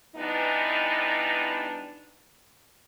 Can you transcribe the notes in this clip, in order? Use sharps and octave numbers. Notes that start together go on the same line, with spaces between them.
E3 G3 B3 D4 D#4